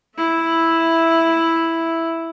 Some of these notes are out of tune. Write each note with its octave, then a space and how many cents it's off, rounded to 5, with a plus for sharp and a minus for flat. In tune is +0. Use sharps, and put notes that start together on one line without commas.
E4 +0 E5 +0